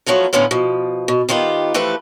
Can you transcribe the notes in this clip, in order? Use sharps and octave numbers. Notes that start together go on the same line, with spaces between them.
F3 F#3 A3 B3 F4
A2 D3 B3 C#4 F4
B2 F3
B2
D#3 B3 F4 G4
E3 F3 A3 G4 B4